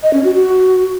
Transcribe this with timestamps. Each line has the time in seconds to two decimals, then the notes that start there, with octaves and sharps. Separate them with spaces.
0.03 D#5
0.13 C#4
0.24 F#4
0.34 F#4